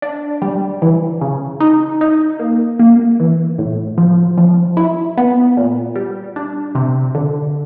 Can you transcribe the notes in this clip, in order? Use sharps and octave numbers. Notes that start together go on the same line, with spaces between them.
D4
G3
E3
C#3
D#4
D#4
A#3
A#3
E3
A2
F3
F3
E4
B3
A#2
G3
D4
C3
D3